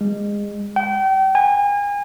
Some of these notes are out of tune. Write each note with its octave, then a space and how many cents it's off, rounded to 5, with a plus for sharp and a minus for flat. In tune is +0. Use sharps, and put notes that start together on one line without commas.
G#3 -25
G5 -35
G#5 -35